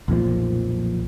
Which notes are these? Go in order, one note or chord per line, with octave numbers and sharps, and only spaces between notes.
B1 F2 A#2 F3